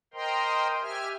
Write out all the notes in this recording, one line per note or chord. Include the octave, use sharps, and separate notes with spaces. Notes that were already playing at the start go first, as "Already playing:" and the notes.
A#4 C5 D#5 G5 A#5 C6
G4 E5 G#5 F6